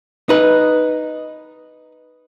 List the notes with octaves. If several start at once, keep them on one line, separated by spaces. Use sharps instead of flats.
D#4 B4